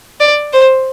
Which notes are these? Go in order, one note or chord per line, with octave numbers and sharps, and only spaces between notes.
D5
C5